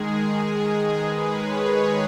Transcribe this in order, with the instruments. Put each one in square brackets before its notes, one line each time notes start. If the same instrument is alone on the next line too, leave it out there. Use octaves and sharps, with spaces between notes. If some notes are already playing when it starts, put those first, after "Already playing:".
Already playing: [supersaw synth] D#3 G#3 G#4
B4
C#5
C#5